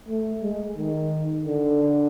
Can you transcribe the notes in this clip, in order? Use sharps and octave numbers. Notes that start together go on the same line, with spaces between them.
A3
G#3
D#3
D3